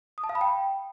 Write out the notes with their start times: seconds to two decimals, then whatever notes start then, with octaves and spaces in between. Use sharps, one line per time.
0.18 D#6
0.24 A5
0.29 F5
0.35 B5
0.41 G5